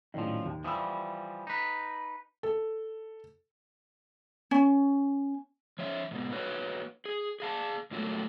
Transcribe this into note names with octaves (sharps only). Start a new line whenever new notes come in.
A#1 F#2 A2 D#3 F3
D#2
E3 F3 G3 D#6 E6
D#4 B4
A4
C#4
F3 C#5 E5
G#2 B2
A#3 F#4 B4 C#5
G#4
G#4 F5 A5
G#2 F3 F#3 A3 A#3